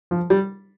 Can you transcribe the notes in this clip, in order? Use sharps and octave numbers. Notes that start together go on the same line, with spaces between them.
F3
G3